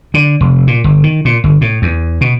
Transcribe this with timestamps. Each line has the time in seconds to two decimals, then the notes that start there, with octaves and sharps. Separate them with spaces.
0.14 D3
0.41 F1
0.67 A#2
0.84 G1
1.03 D#3
1.25 A#2
1.44 G1
1.61 A2
1.82 E2
2.21 B2